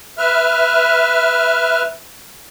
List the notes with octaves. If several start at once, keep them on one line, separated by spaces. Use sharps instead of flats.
B4 E5 F6